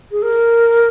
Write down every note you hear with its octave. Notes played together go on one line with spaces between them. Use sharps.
G#4
A#4